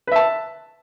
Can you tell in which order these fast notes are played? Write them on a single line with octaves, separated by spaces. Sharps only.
B4 E5 A5